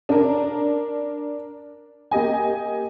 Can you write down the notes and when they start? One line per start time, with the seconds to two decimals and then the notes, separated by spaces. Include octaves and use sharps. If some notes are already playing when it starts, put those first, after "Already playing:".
0.09 D4 A#4
2.11 A#3 G4 D#5 G#5